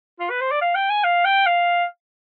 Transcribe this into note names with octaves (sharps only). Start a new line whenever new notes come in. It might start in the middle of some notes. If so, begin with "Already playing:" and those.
F4
B4
C5
D5
F5
G5
G#5
F5
G5
F5